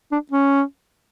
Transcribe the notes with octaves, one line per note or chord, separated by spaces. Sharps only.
D4
C#4